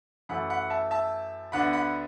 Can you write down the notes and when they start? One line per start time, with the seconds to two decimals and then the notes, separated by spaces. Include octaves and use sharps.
0.29 F#2 E3 A3 F#5 B5
0.50 F#5 B5
0.70 E5 A5
0.91 E5 A5
1.52 D2 D3 B3 D4 F#5 B5
1.73 F#5 B5